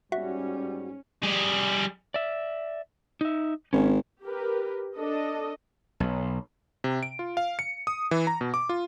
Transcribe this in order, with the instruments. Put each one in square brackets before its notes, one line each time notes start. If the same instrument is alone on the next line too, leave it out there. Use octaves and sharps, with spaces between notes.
[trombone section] G#2 G3 [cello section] C#4 [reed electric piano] F#4 [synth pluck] E5
[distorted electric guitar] G3 G#4
[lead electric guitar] D5 E5
D#4 E5
[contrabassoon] G#1 [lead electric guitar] C#4
[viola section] G4 A#4 B4
D4 A4 D#5
[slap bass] B1
[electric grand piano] C3
D7
F4
F5
C#7
D#6
E3
A#5
B2
D6
F4